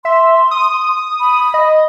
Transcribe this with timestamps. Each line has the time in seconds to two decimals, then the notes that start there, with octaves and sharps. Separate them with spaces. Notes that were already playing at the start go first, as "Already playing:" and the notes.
0.05 E5 C6
0.51 D#6
1.20 B5
1.54 D#5